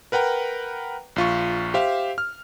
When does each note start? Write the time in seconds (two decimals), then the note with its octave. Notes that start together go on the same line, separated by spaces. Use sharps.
0.12 A#4 B4 F#5 G5 A#5
1.16 A#1 F4 C#6
1.74 G4 C5 E5 F5
2.18 F6